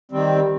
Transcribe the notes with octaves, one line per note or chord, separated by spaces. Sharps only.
D#3 G3 C4